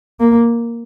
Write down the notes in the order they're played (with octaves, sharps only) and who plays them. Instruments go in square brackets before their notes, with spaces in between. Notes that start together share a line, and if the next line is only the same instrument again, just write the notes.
[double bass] A#3